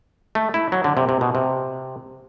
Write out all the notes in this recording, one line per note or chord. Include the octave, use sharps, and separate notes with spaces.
A3
E4
F#3
D3
C3
C3
B2
C3